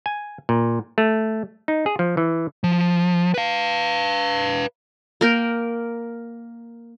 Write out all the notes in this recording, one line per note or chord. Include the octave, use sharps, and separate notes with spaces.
G#5
A#2
A3
D#4
G#4
F3
E3
F3
B4 F5
A#3 A#4 G5